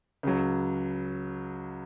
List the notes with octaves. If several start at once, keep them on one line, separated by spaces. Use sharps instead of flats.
C#2 C#3 F#3